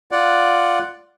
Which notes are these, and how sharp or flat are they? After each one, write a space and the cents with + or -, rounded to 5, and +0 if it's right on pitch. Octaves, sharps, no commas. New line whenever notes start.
F4 +0 D5 +0 F#5 +0